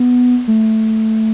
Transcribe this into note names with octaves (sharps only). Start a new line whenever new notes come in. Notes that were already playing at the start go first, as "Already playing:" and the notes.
Already playing: B3
A3